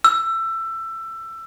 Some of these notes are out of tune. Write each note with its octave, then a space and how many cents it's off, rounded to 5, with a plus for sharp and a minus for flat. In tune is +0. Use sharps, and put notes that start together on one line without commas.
E6 +20